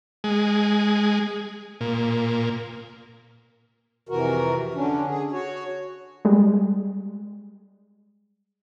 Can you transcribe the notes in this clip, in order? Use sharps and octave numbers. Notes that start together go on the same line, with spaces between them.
G#3
A#2
F2 C3 E3 F#4 A#4
D3 C#4 D4
G#4
F#4 C#5
G3 G#3